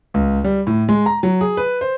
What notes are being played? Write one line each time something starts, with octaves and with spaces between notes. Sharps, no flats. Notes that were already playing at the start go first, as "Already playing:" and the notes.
C#2
G3
A2
G#3
A#5
F#3
G#4
B4
C5